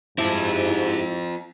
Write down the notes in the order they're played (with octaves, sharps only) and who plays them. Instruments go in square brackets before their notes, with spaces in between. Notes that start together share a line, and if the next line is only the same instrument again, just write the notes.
[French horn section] G#2 [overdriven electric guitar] C4 F4 [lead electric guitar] E4 [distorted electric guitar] G4 A5